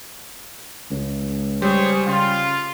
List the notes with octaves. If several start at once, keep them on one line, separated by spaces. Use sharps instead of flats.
C#2
G3 G#4 C5 C#5
C#3 F4